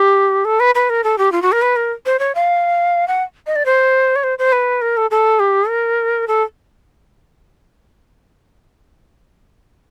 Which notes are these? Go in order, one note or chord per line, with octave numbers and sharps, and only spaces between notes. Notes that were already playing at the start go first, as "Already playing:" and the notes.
Already playing: G4
A4
B4
B4
A#4
A4
G4
F4
F#4
A#4
B4
A#4
C5
C#5
F5
F#5
D#5
D5
C5
C#5
C5
C5
B4
A#4
A4
A4
G4
A#4
A4